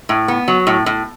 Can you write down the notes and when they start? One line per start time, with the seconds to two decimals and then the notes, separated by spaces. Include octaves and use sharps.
0.09 A2
0.28 B3
0.48 F#3
0.67 A2
0.86 A2